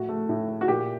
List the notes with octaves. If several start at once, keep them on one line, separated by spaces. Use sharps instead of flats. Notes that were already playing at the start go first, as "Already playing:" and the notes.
Already playing: A2 F#4
A3
A2
A3
F#4
A#2 G4